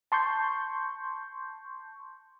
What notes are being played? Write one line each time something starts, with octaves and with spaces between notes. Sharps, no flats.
A5 C6 C#6 G6